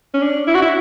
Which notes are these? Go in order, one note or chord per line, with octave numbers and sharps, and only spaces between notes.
C#4
D4
E4
F#4
E4